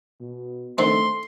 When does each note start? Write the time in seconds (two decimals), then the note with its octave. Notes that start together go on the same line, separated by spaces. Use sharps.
0.21 B2
0.78 D3 D#3 A3 C4 C6